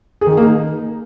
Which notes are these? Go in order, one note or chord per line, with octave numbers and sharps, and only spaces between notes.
G#4
D#3
G#4
A#3
D#4